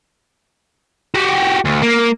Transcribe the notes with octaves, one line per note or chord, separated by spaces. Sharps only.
F#4 G4
D2
A#3